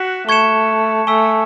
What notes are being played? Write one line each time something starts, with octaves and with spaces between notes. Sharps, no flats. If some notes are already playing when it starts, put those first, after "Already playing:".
Already playing: F#4 F#6 B6 E7
A3 C#6 G#6 C#7 E7
A3 G#5 C#6 E6 B6